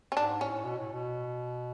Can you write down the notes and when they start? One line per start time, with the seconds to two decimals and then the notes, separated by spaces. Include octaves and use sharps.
0.12 C#4
0.17 G#2 D4
0.41 A2 C#4
0.65 B2
0.78 A2
0.93 B2